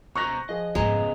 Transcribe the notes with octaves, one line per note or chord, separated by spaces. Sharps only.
B2 C5 A#5 C#6 F#6 A#6
F3 G#4 D#5
F2 G#2 C#3 G#3 B3 A#5